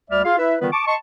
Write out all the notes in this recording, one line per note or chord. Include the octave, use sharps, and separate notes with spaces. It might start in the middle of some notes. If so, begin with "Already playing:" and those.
D2 G3 A3 D5 E5 F6
F4 G#4 F5
E4 B4 E5
D3 D#3 G3 B3 F4 B4
A5 C#6 D6
D#5 A5 C6 C#6